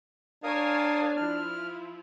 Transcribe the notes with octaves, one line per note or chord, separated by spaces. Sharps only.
D4 A#4 C#5 F5 G#5 A5 D#6
F3 E4 F6